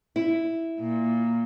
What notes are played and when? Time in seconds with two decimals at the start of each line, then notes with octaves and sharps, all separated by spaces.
0.16 E4
0.80 A#2